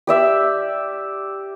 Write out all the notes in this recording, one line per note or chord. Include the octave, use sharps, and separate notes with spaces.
G4 D5 E5